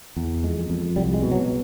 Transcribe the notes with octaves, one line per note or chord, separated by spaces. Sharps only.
E2
F2 G#3
F2
C2 G3
G#3
B2
F#3